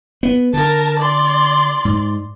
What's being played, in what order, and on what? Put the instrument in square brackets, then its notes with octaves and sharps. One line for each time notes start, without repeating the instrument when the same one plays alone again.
[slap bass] B3
[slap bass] D3 [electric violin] A#4 A5
[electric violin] D5 C6
[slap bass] G#2